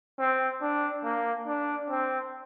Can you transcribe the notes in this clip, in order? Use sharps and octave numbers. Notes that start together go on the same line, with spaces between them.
C4
D4
A#3
D4
C4